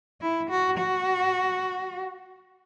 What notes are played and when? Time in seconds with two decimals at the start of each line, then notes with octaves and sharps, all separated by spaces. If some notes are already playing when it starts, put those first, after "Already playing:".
0.21 E4
0.50 F#4
0.78 F#4